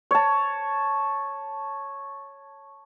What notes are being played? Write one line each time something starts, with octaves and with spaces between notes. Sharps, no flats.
C#5 A5